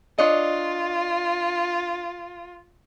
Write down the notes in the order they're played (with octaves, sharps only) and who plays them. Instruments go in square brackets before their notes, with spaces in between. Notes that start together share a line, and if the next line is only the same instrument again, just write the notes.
[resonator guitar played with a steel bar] D4 C#5 D#5 [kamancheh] F4